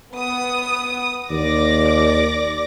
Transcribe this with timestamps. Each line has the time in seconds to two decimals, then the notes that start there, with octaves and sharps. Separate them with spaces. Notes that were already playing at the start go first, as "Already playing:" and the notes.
0.14 B3 D#6
1.31 D#2 D5 D6 A#6